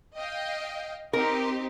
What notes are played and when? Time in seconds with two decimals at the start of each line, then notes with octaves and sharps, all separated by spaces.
0.16 D#5 F5 G5
1.13 C4 D#4 G4 A#4